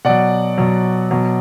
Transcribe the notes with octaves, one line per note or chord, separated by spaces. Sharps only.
B2 F#3 D5 F#5
B2 F#3
B2 F#3